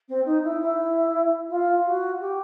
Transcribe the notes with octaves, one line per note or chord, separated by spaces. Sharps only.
C4
D#4
E4
E4
F4
F#4
G4